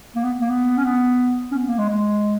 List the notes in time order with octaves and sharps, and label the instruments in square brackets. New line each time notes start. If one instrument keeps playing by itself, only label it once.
[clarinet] A#3
B3
A#3
B3
C#4
B3
C#4
B3
A#3
G#3
G#3